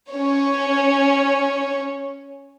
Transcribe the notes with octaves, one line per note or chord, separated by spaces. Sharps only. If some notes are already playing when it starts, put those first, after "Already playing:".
C#4 C#5